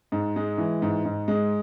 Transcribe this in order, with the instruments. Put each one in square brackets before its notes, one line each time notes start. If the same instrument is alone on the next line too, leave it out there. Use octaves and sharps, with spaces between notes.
[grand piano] G#2
G#3
E3
G#2
G#2
G#3